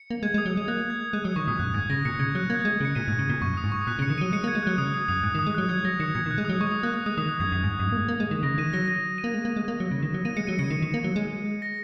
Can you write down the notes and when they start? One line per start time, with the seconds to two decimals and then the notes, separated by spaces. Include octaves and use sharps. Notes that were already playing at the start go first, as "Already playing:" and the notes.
Already playing: C#7
0.11 A#3
0.23 G#3 G#6
0.34 G#3
0.38 D#6
0.46 F#3
0.57 G#3
0.68 A#3 F#6
0.90 G#6
1.13 G#3 F#6
1.24 F#3 D#6
1.36 D#3 C#6
1.48 A#2 D#6
1.59 F#2 F#6
1.74 G#2 G#6
1.90 C#3 A#6
2.05 A#2 C#7
2.19 C#3 G#6
2.35 F#3 F#6
2.50 A#3 G#6
2.62 G#3 G#6
2.80 C#3
2.85 C#7
2.95 A#2 D#7
3.08 G#2
3.19 C#3
3.30 A#2
3.42 F#2 C#6
3.57 D#6
3.64 G#2
3.72 C#6
3.87 A#2 F#6
3.99 C#3
4.02 C#7
4.10 D#3
4.18 F#3 D#7
4.33 G#3 C#7
4.44 A#3
4.48 G#6
4.55 G#3
4.63 F#3 F#6
4.78 C#3 D#6
4.94 D#6
5.08 F#2 D#6
5.23 G#2 F#6
5.35 D#3
5.39 D#6
5.47 G#3
5.55 F#3 F#6
5.69 F#3 G#6
5.85 F#3 A#6
6.00 D#3 C#7
6.15 A#2 G#6
6.26 D#3
6.31 F#6
6.38 G#3
6.45 F#3 D#6
6.61 G#3 C#6
6.71 D#6
6.83 A#3 F#6
6.94 F#6
7.06 G#3 D#6
7.17 D#3 D#6
7.29 F#6
7.40 F#2 G#6
7.52 F#2
7.63 G#2
7.80 F#2
7.85 G#2
7.93 A#3
7.97 G#3
8.09 A#3
8.20 G#3
8.31 D#3
8.43 C#3 A#6
8.58 D#3 D#7
8.73 F#3 A#6
8.88 A#6
9.18 D#7
9.24 A#3
9.34 G#3
9.45 A#3
9.57 G#3
9.68 A#3
9.80 F#3
9.91 C#3
10.02 D#3
10.14 F#3
10.25 A#3 D#7
10.37 G#3 C#7
10.47 F#3 D#7
10.59 C#3 C#7
10.70 D#3
10.82 D#3
10.94 A#3
11.04 F#3
11.16 G#3
11.62 A#6